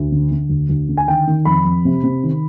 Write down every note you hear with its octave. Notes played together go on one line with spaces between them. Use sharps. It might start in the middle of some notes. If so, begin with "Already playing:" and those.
Already playing: D2
D3
D3
D2
D2
D3
G#5
D#3 G5
D#3
F2 B5
F2
C3
C3
D#3